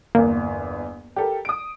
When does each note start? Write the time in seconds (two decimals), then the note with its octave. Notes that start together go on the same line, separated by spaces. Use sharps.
0.15 G1 E2 A#3
1.16 G4 A4 A#4
1.45 D#6 D7